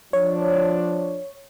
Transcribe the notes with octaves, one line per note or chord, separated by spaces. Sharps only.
F3 D4 C#5